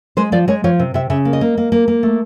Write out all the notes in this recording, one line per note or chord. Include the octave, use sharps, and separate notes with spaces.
G#3 C5
F3 D5
G#3 C#5
F3 C#5
C3
C3 E5
C#3 E5
A#3
D#5
A#3
A#3
A#3
A#3
A3